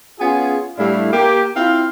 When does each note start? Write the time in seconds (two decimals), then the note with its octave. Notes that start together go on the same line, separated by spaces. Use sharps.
0.20 B3 C#4 F4 G#4
0.78 A2 G3 A3 D4 E4 F5
1.13 A#3 G4
1.56 C4 E4 F4 F5